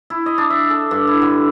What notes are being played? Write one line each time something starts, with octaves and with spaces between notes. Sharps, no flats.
E4
D#5
D4
E5
A4
G2
E4
D3